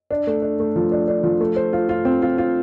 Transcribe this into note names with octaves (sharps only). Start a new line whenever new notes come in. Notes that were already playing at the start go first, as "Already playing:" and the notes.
D4
A3
D4
A3
F3
D4
D4
F3
A3
C5
F4
F4
C4
F4
F4